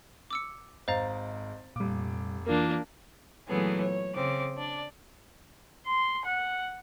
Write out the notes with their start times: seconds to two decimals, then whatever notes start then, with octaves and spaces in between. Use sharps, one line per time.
0.31 D6 E6 C#7
0.88 G#1 C5 D#5 F5 A#5 A6
1.76 F1 A#2 G3 D6
2.47 E3 A#3 D4 F4 A#4
3.48 A#2 E3 F#3 A3 B3 G#4
3.81 C#5
4.14 C#3 C4 D6
4.56 D4 D5
5.87 C6
6.25 F#5